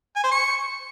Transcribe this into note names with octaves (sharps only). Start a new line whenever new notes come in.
G#5
C5
C#6